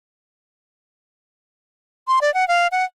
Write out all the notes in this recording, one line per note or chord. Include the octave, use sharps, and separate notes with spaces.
C6
D5
F#5
F5
F#5